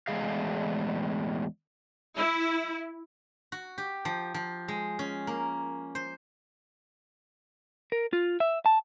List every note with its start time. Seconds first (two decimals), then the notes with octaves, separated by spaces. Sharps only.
0.08 E2 A2 G#3 G#4 F5
2.18 E4
3.52 F#4
3.78 G4
4.05 F3
4.34 F3
4.68 G#3
4.99 C#4
5.27 A#3
5.95 C5
7.92 A#4
8.13 F4
8.40 E5
8.66 A5